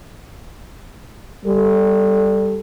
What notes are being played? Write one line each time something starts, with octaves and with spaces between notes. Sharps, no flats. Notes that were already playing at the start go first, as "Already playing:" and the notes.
G3 A4